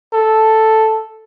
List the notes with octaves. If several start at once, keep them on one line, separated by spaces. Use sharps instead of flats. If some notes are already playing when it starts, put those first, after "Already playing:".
A4